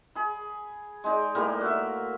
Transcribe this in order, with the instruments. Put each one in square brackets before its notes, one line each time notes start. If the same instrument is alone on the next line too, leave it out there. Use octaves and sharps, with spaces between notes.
[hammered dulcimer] G#4 B5
G#3 D#4 D5
A2 G3 A#3 A#4
F#4 E5